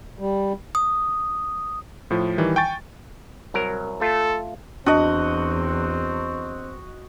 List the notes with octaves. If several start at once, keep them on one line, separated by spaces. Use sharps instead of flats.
G3
D#6
A2 F3
D#3 E3 G3
G5 G#5 C#6 A6
C2 F#3 A#4
A3 F4 A4
E2 C4 D4 F#4 D#5